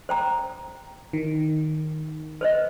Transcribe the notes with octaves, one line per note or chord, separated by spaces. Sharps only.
C5 G5 A#5
D#3
B4 C5 D#5